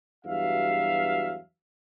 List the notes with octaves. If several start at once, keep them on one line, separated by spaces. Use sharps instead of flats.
E2 G2 F#3 F#4 E5 F5